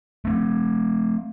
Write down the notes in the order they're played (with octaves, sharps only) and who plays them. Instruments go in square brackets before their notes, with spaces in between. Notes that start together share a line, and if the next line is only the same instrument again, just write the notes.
[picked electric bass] A3 A#3 C4